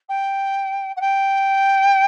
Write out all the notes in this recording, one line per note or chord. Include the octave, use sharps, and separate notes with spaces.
G5
F#5
G5